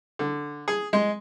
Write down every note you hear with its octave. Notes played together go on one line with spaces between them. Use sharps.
D3
G#4
G#3